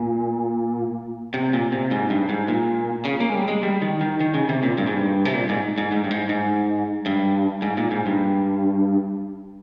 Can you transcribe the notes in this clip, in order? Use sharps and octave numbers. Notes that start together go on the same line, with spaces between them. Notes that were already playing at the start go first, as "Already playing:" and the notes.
Already playing: A#2
C3
A#2
C3
G#2
G2
G#2
A#2
C#3
A#3
G#3
G3
G#3
G3
D#3
D#3
D#3
C#3
C3
A#2
G2
G#2
G2
C3
A#2
G#2
G#2
G#2
G2
G#2
G#2
G2
G#2
A#2
G#2
G2